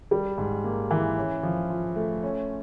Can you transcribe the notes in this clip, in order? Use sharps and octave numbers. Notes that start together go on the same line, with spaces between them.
G3
G#2
A#3
E3
C#4
F3
F4
A3
C#4